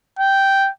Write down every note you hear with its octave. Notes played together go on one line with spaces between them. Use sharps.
G5